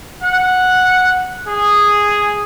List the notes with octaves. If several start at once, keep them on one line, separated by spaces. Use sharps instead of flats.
F#5
G#4